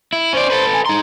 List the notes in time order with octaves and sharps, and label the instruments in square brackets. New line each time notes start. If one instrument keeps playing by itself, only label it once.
[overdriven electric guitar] E4
[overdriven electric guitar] C#4 D5 [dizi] C5
[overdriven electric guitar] A4 B4
[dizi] G#5
[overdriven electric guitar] D#4 C6 [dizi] A#5